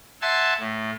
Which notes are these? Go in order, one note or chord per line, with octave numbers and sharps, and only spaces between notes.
E5 F#5 G#5 A5 C6 E6
A2